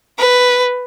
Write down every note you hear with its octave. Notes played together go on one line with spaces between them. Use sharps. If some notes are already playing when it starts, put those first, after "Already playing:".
B4